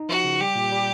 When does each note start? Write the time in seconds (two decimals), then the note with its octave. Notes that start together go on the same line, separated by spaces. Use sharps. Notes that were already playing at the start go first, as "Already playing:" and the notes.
Already playing: D#4
0.09 F3 F#4
0.24 C#3
0.40 G3 G4
0.55 A#2
0.72 G3